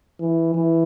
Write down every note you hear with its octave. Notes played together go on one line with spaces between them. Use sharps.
E3
E3